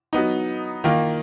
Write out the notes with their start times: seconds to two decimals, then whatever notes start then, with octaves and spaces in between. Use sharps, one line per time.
0.13 F#3 B3 D#4
0.84 D#3 A#3 F4